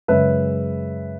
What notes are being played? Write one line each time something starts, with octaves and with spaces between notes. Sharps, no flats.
F#2 C#3 G#3 B4 E5